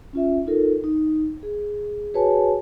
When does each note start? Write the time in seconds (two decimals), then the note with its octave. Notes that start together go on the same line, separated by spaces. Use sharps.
0.13 C#4 F4 E5
0.46 D#4 F4 A4 A#4
0.84 D#4
1.43 G#4
2.14 F#4 G#4 B4 C#5 G#5 A5